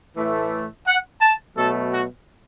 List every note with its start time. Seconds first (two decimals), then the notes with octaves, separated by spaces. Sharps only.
0.16 A2 E3 A3
0.86 F#5
1.21 A5
1.56 B2 F#3 A3 A4
1.90 F#4